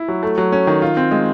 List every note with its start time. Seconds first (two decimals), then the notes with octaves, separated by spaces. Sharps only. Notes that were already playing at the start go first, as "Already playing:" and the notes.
Already playing: E4
0.08 F#3
0.23 A3
0.38 F#3
0.52 C#4
0.67 D#3
0.82 F4
0.97 C4
1.11 G#3